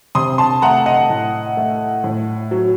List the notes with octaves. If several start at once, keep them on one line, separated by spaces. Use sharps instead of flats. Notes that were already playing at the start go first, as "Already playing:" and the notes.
C3 C6 D#6
A5 C6
A3 F#5 A#5
D#5 F#5
A2
A3
A2
F#3